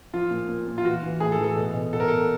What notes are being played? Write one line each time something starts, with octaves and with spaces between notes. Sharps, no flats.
F3 F4
A#2
A#2
A#2
F4
E3 F#4
E3
A2 G#4
A4
E3
A4
B2
B2
B2 A4
A#4
B2 A4